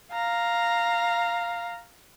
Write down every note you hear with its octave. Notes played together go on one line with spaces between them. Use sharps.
F5 A#5